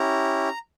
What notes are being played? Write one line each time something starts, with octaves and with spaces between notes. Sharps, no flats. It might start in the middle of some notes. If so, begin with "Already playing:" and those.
Already playing: C#4 E4 G4 A#5